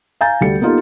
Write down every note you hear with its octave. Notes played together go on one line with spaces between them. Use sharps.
F5 G#5 A#5 G6 A6
D2 G3 A4 C#7
A#3 B3 D#4 F4 G4 A4